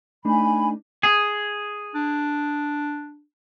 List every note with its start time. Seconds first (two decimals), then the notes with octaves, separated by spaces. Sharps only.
0.25 A3 D4 D#4 G#5 B5
1.03 G#4
1.95 D4